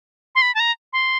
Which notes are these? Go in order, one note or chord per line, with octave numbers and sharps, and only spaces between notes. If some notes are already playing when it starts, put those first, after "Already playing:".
C6
B5
A5
A#5
C6